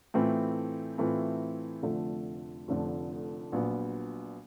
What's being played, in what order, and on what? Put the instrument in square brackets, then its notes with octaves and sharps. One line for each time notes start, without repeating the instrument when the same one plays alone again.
[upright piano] A2 E3 A3 C4 F4
A2 E3 A3 C4 F4
F1 F2 D3 F3 A3
F1 F2 D3 F3 A3
A#1 A#2 F#3 B3